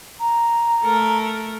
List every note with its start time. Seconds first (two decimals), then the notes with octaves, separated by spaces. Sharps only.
0.20 A#5
0.83 A3 A4 A#4